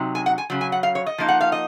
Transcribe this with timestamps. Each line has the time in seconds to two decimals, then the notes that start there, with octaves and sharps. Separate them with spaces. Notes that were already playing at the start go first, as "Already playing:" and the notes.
Already playing: C3 F#3 D#4
0.15 G#5
0.26 F#5
0.38 G#5
0.50 C#3 F#3
0.61 G#5
0.72 F#5
0.83 F5
0.95 C#5
1.06 D#5
1.18 F3 A#3 D#4
1.28 F#5
1.41 F5
1.52 D#5